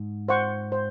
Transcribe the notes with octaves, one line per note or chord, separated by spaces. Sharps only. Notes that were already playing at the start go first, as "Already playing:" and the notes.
Already playing: G#2
C5 F#5 C#6
C5